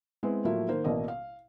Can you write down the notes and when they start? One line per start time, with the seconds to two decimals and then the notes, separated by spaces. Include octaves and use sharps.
0.23 G#3 B3 C4 E4
0.45 A2 F3 F#3 A#3 E4 F4
0.68 D#3 A#3 C5
0.84 A1 B2 A#3 D5 D#5
1.08 F5